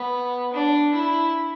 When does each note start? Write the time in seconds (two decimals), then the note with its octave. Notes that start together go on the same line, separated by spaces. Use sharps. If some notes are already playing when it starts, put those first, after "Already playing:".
Already playing: B3
0.53 D4
0.93 E4